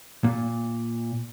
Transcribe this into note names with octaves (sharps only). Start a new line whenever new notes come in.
A#2